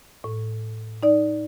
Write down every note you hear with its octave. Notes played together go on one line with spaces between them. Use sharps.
A2
D#4 D5